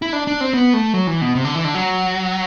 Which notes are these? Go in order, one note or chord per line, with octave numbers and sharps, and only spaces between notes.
E4
D4
D4
C4
B3
A3
F#3
E3
B2
C3
D3
E3
D3
F#3